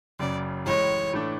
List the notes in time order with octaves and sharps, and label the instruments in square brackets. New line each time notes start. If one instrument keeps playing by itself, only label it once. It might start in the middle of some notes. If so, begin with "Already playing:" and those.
[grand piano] F#1 F#2 C#3 [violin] D5
[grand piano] A1 A2 G#3 [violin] C#5
[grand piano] A2 E3 A3 D4